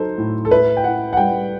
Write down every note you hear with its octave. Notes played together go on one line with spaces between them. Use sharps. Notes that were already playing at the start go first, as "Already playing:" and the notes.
Already playing: F#3 D#4 A4 C5
A2
A4
E4 B4
G5
E4 F#5
F#5
G3 G5